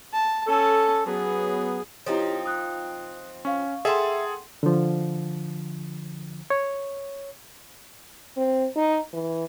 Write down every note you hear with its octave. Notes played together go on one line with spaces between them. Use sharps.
A5
C#4 A4 A5
F#3 B3 G#4
F3 C4 D#4 E4 G4 C#5
D#6 F#6
C#4 F5 C#6
G#4 A4 E5 F#5 G5 A5 C6
D3 F3
C#5
C4
D#4
E3